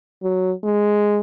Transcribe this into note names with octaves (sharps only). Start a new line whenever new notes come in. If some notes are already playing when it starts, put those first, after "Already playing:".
F#3
G#3